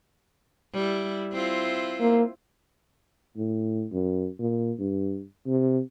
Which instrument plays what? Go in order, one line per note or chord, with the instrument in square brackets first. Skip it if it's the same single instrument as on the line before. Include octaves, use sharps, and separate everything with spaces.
[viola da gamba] G3 E4
C4 E4 F4
[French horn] A#3
[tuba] A2
F#2
A#2
G2
C3